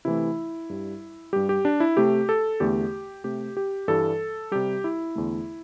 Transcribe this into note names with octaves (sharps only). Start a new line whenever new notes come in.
C3 E3 A3 E4
G2 G3
G2 G3 G4
G4
D4
E4
C3 A3 G4
A4
E2 D3 A3 G4
C3 A3 G4
G4
G2 E3 G3 A4
C3 G3 G4
E4
E2 D3 A3